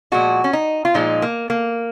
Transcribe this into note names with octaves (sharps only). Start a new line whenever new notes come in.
A#2 F3 G#3 F#4
C#4
D#4
F4
A#2 F3 G#3 D#4
A#3
A#3